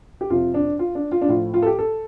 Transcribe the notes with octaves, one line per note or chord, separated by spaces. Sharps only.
G4
F2 C3 F3 F4
D4
F4
D4
F4
D4
A2 F3 F4
F4
A4
G4
A4